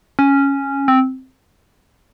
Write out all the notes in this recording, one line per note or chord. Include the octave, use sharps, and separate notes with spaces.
C#4
C4